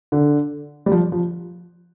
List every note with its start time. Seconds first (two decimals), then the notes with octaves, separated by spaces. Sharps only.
0.12 D3
0.86 G3
0.92 F3
1.12 F3